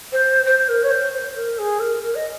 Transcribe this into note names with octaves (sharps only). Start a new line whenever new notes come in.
C5
C5
A#4
C#5
C5
C5
A#4
G#4
A#4
A#4
D#5